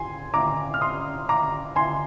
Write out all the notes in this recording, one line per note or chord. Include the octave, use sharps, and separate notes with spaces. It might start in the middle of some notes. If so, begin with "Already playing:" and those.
Already playing: G#5 C6
A#5 D6
F6
C6 D#6
A#5 D6
G#5 C6